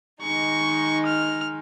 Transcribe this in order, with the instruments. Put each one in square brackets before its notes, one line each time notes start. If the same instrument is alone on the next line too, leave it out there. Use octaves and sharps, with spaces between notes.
[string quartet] D#3 G#3 D#4 [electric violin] C#6
[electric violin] F6